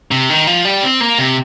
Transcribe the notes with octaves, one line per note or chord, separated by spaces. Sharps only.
C3
D#3
F3
G3
C4
A#3
C3